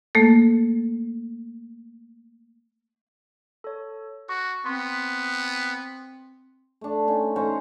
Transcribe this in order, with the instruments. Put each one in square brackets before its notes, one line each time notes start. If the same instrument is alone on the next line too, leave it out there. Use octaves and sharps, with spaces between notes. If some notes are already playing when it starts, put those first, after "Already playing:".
[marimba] A3 A#3 A4
[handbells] A4 C#5
[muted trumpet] F#4 [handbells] C#6
[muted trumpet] B3 [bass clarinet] C4 [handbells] C6
[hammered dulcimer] A3 D4
C#4 D#4 F4
C#4 C5 A#5 C#6